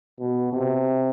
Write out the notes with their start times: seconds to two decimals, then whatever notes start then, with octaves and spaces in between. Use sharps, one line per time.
0.19 B2
0.53 C3